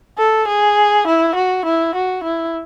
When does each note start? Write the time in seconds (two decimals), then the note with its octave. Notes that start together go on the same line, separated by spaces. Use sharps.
0.18 A4
0.48 G#4
1.07 E4
1.35 F#4
1.66 E4
1.95 F#4
2.24 E4